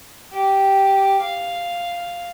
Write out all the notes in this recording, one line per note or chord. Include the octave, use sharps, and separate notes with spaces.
G4
F5